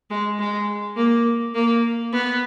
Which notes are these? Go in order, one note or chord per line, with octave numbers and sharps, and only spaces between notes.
G#3
G#3
A#3
A#3
B3